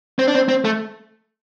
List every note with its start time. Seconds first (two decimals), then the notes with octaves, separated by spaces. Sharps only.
0.19 C4
0.28 D4
0.34 C4
0.48 C4
0.65 A3